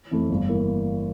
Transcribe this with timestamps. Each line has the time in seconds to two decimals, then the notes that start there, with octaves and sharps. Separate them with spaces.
0.11 F2 E3 A3
0.30 G1
0.49 E3 A#3